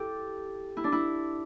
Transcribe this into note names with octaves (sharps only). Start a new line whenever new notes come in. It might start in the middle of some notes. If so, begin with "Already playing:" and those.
Already playing: E4 G4 A4
E4
D4
E4